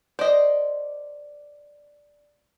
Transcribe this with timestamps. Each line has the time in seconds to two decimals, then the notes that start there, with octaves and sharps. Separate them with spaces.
0.19 C5 D5 D#5